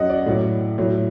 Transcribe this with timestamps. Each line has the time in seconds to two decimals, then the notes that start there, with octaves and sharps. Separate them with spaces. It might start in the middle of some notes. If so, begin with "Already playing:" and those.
Already playing: F#2 F#3 D#5 F#5
0.10 D5
0.26 A2 F#3
0.78 A2 F#3